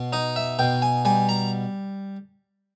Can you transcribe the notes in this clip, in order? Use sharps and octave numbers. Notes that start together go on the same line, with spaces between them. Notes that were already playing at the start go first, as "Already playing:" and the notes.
Already playing: B2
D#4 D#5
E5
B2 G5
G#5
G3 G#5
A#5